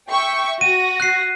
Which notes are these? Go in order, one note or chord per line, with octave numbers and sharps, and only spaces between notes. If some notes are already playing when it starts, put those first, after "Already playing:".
E5 G5 C#6
F#4 A#6 D#7
F#6 C7